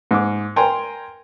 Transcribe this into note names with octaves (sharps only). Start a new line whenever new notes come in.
G#2 D6
A#4 G5 G#5 A#5 C6